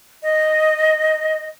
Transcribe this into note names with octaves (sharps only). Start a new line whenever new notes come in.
D#5